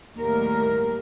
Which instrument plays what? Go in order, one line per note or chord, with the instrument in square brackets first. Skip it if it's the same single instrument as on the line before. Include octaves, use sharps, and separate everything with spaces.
[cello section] D#2 A2 G3 A#4